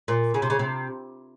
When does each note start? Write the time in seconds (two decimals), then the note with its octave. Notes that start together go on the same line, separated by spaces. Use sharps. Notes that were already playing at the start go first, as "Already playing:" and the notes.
0.08 A#2
0.34 C#3
0.42 C3
0.50 C#3
0.59 C3